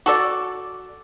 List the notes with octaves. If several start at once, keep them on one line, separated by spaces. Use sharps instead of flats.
F#4 A4 D5